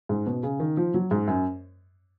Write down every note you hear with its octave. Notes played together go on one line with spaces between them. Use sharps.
G#2
B2
C#3
D#3
F3
F#3
G#2
F#2